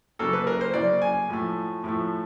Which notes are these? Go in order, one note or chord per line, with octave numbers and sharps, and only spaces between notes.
C#3 F#3 A#3 A4
B4
A#4
C5
C#3 F#3 A#3 D5
G#5
A2 F3 A3
A2 F3 A3